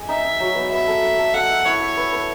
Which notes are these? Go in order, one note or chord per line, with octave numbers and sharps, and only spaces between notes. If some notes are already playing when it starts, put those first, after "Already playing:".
Already playing: G#4 D#5
D#4 E5
D#4
F#3
B3
B3 E5
A4
A4
A4
A4 F#5
E5
E4 C#5
E5
B4
B4